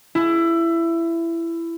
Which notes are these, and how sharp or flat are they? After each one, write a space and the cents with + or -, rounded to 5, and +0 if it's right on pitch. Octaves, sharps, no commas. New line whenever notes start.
E4 +20